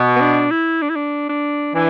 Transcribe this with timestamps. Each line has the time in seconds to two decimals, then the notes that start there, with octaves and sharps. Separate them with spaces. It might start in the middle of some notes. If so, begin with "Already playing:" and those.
Already playing: B2
0.16 B3
0.20 D4
0.50 E4
0.82 D4
0.89 E4
0.96 D4
1.29 D4
1.74 E3 D4